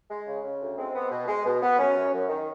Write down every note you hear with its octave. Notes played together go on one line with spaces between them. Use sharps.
G#3
C#3
C#3
D2
G#3 C4
B3
B2
G#3
B2
B3
F#2 C#4
F#2
F#2
D#3